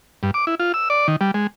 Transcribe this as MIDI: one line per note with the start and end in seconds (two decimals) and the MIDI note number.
0.23 0.31 43
0.34 0.45 86
0.47 0.55 64
0.60 0.72 65
0.74 0.89 88
0.90 1.07 74
1.08 1.16 51
1.21 1.31 55
1.34 1.47 56